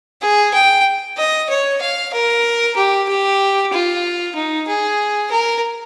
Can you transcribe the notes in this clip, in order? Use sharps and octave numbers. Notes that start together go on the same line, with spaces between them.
G#4
G5
D#5
C#5
F5
A#4
G4
G4
F4
D#4
G#4
A#4